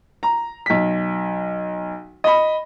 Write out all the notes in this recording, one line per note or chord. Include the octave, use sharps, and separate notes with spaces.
A#5
B1 B6
D#5 B5